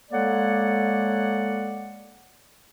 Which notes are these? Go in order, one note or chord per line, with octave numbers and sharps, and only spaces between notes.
G#3 A#3 A4 C#5 D5 F#5